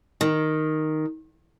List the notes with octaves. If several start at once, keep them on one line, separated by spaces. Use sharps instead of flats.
D#3